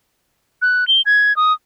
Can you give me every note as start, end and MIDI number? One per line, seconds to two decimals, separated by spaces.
0.62 0.87 90
0.88 1.02 103
1.06 1.36 92
1.36 1.53 87